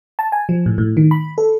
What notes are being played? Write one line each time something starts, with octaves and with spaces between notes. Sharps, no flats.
A5
G#5
F3
A2
A2
D#3
B5
A4